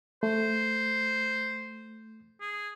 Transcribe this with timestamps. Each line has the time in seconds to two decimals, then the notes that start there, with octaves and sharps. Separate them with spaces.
0.23 A3 C5
2.41 G#4